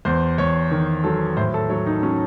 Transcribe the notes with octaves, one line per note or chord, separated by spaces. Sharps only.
E2 C5
E2 C#5
D#3
F#3 A4
A2 C5
A4
F#3 C#5
D#4
F#3 C#4